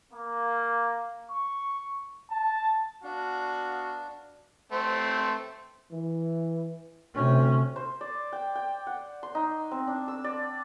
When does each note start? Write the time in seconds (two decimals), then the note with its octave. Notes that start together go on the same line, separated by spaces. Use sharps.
0.11 A#3
1.29 C#6
2.30 A5
3.04 B3 D4 F#4 F5
4.72 A3 C4 C5
5.91 E3
7.15 D2 C3 C#4
7.76 C5
8.01 D5
8.33 G5
8.55 G5
8.87 F#5
9.23 C6
9.35 D#4
9.71 C4
9.87 D4
10.08 E6
10.24 D5